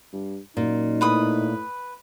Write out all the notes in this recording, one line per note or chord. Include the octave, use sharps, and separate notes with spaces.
G2
F#2 A#2 D#4
A2 B4 B5 D#6